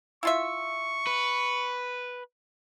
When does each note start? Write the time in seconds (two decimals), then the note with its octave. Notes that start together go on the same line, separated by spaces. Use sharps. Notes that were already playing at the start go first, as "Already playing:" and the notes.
0.23 E4 F4 E5 C#6
1.07 B4